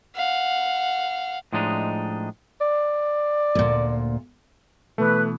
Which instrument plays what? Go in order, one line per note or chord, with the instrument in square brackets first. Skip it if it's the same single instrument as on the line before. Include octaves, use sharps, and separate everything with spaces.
[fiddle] F5 F#5
[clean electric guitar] A2 F3 G#3 D4 D#4
[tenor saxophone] D5
[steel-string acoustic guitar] D2 A#2
[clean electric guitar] B2 E3 [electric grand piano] A3 [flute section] B4